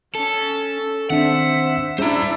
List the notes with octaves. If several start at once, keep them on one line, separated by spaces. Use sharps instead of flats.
C#4 A4
D#3 C4 D4 C5 E5 F#5
G3 C#4 D4 E4 G#4 C5 A#5